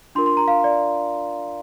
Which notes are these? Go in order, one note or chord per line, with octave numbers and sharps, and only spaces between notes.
D4 F4 A#4 C6
C6
A#5
F5
D5